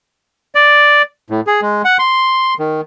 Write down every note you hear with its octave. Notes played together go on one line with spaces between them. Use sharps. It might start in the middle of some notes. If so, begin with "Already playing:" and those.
D5
A2
G#4
G#3
F#5
C6
D#3